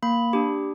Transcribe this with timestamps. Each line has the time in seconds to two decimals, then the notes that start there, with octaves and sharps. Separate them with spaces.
0.03 A#3 B5
0.33 D4 G4